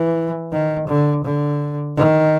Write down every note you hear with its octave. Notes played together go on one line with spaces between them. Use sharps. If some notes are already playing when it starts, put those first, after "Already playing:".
Already playing: E3
D#3
D3
D3
D#3